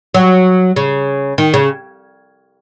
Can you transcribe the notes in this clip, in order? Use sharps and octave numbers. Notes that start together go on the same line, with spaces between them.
F#3
C#3
D#3
C#3